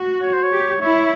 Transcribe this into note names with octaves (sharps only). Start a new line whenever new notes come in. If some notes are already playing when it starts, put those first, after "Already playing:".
Already playing: F#4
C#5
C5
C#5
G4
E4 C#5